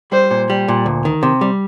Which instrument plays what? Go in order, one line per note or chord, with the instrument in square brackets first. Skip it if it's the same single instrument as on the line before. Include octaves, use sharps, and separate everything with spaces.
[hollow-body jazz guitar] G3 [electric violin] C5
[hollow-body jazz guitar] A#2
G3
A#2
D2
D#3
C3
G3